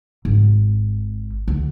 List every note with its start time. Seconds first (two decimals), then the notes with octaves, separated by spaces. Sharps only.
0.25 G#1
1.48 D2